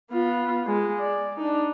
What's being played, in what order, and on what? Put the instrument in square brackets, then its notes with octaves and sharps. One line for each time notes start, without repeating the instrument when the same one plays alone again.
[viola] B3 F4
G#3
D5
D4 D#4